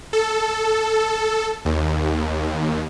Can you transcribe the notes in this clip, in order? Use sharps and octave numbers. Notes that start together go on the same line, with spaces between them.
A4
D#2